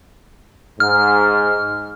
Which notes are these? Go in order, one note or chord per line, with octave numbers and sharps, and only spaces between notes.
G#2 F6